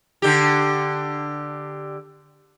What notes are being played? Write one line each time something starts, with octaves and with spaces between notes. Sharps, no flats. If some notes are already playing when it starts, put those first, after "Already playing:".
D3 G4